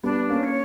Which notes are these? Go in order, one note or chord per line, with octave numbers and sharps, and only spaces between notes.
G3 B3 D4
A#3 C#4
C#5